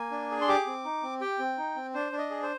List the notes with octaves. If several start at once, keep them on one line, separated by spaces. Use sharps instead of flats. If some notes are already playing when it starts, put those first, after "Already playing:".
Already playing: A#3 G#5
D4
G#4
C6
G4 D6
C4
D#4
C4
G4 G5
C4
D#4
C4
D4 C5
D4
D#5
G#4
C5